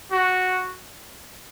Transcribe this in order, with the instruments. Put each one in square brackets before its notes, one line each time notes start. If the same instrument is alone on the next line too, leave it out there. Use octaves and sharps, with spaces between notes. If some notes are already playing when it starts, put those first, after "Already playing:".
[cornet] F#4